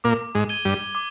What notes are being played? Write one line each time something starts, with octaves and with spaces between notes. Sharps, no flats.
A#2 A#3 D6
G#2 G#3
G#6 D#7 G7
G2 G3
D6